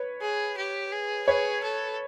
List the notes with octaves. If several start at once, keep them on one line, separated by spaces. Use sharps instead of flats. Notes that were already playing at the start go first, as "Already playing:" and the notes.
Already playing: B4 C#5
G#4
G4
G#4
G#4 B4 C#5
A4